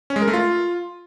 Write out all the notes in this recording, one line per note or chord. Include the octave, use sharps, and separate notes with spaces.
C#4
G#3
A#4
A3
F4